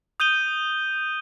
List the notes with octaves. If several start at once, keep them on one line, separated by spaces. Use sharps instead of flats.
D#6 G6 D#7 G7